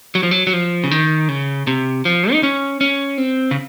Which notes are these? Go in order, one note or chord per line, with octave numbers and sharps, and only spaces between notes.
F#3
F3
F#3
F#3
F3
C#3
D#3
C#3
C3
F3
D#4
C#4
C#4
C4
C#3